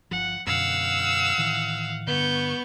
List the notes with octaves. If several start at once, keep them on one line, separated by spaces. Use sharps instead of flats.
G1 F3 F#5
F#2 B2 D3 F5 F#5 E6
A2 D#3 E3
G2 D3 B3 C#6 G6